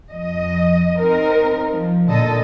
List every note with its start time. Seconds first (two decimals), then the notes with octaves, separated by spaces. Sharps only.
0.10 F2 D#5
0.99 C4 D#4 A#4
1.71 F3
2.07 A#2 D3 A4 D#5